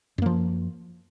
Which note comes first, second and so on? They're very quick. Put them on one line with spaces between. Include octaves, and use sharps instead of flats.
F#2 A#3 F3